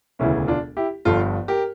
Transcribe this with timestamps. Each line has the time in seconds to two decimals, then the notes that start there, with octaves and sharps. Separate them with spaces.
0.19 E1 D2 C#3 E3 C#4 E4
0.48 D4 F4
0.77 E4 G4
1.05 G1 G2 F3 F4 A4
1.48 G4 A#4